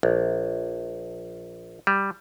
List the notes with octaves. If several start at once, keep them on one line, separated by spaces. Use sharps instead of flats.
A#1
G3